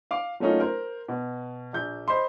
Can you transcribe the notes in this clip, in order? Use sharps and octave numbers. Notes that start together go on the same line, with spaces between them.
F5 D6
F#3 A3 A#3 C#4 D#4 F4
A#4 C5
B2
A#1 G6
C5 D#5 B5 C6